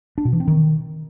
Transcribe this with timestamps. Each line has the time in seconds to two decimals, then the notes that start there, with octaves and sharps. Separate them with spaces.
0.18 D4
0.25 B2
0.33 E3
0.40 C4
0.47 D#3